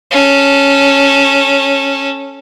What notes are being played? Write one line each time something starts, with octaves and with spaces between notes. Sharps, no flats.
C#4 A4